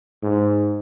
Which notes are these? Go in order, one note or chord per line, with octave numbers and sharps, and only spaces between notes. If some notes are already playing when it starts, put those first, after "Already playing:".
G#2